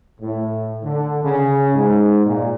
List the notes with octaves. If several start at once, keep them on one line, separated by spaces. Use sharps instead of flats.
A2
D3
C#3
G#2
A#2